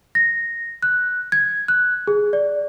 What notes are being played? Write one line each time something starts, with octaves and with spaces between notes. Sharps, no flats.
A#6
F#6
G#6
F#6
G#4
D5